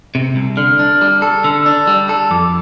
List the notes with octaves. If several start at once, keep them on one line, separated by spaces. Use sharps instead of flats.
C3
C2
D3 F6
D4
G3
A4
D3 E6
D4
G3
A4
F2 D6